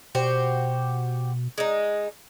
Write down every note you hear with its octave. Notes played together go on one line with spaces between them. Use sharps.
B2 F#4 G4 C5
G#3 D#4